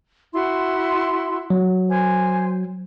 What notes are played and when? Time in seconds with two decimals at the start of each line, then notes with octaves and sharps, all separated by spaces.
0.33 E4 F#4 C6
1.50 F#3
1.89 C5 G#5